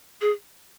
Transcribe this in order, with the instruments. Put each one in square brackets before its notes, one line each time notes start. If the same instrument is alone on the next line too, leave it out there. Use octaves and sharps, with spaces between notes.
[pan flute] G#4